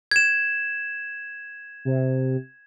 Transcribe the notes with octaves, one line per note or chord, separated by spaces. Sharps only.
G#6 E7
C3